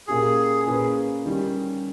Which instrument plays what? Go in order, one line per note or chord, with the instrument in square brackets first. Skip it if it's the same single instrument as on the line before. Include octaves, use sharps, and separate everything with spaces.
[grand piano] A#2 A#3 C#4 G4 [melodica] G#4
[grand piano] A#2 A#3 C#4 G#4 B4
D#3 G3 C#4 G4